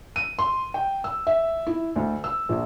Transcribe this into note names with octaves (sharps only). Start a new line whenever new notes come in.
D#7
C6
G5
E6
E5
E4
D2
E6
A#1